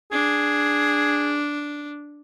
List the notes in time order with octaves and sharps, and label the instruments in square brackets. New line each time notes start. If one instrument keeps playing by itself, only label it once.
[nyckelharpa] D4 [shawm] G#4